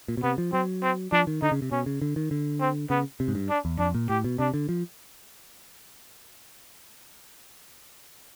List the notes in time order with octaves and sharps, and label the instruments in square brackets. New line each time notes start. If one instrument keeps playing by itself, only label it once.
[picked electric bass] A#2
B2
[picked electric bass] C3 [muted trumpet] B3
[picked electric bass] F3
[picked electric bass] F#3 [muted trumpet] C4
[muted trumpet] C4
[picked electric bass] F3 [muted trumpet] D4
[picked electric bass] D#3
[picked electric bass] D3 [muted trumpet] D#4
[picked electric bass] C#3
C3
[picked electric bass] B2 [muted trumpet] C#4
[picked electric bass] C#3
D3
D#3
D3
[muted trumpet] C4
[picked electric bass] C#3 [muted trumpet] B3
[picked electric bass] C3
G#2
G2
[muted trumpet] D4
[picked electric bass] E2
[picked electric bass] F2 [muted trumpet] D4
[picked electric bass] A#2
[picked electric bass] A2 [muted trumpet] G4
[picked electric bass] B2
[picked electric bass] C3 [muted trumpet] D4
[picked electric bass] D3
F3